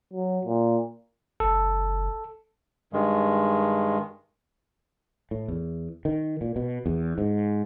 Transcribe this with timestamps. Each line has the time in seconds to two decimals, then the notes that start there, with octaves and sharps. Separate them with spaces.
0.14 F#3
0.46 A#2
1.40 F#1 A4
2.93 G2 D#3 G#3
5.31 A2
5.48 E2
6.05 D#3
6.41 A#2
6.56 B2
6.86 E2
7.18 G#2